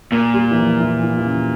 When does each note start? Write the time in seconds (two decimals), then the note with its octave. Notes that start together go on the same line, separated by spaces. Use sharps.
0.12 A#2 A#3
0.34 G3
0.51 E3
0.58 F3
0.80 E3
1.03 E3
1.16 E3
1.26 C#3